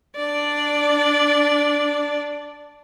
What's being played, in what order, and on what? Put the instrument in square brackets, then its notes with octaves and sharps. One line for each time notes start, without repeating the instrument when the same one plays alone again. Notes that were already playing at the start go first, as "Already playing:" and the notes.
[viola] D4 D5